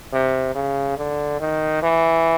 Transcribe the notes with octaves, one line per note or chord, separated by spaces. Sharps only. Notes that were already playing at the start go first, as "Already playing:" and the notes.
C3
C#3
D3
D#3
E3